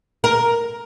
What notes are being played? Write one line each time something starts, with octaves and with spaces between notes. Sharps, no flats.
A#4